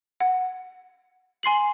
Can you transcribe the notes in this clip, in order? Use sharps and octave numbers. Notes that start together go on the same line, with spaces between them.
F#5
G#5 C6 C7 F#7